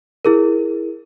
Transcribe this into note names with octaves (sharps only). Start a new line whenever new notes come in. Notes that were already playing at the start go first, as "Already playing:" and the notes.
E4 G#4 A#4